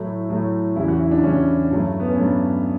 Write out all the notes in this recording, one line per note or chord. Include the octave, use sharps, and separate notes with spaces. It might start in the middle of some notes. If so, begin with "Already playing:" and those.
Already playing: A2 F#3 A3 E4
A2 F#3 A3
E2 C#3 E3 G3 E4
F#4
E4
D4
E2 C#3 E3 G3 C#4
G2 F#3 A3
B3
C#4
G2 F#3 A3 D4